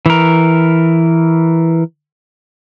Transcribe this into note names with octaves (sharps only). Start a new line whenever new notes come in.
E3 A#4